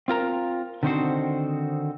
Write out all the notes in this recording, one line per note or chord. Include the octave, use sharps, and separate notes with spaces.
C4 F4 A#4 A#5
D3 D#3 C4 D#4 F#4 C5